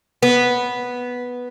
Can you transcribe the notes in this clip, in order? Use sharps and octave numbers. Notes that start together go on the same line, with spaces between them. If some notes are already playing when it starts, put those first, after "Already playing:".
B3